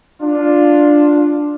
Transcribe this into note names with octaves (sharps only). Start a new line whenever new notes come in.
D4 F4